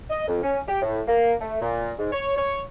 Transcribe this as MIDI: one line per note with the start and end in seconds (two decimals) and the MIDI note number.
0.10 0.24 75
0.28 0.42 41
0.43 0.60 61
0.68 0.81 67
0.82 1.01 45
1.08 1.33 58
1.41 1.61 57
1.62 1.92 46
1.99 2.11 44
2.12 2.34 73
2.37 2.62 73